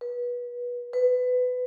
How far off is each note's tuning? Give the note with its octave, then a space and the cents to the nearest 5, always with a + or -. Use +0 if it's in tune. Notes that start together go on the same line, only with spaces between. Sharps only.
B4 -25
B4 +20